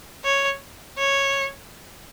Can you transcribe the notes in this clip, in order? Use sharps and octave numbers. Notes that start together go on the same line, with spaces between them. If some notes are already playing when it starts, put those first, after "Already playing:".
C#5
C#5